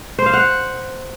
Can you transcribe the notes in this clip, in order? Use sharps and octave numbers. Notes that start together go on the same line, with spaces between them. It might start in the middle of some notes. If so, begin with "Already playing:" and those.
C5
F5
F#5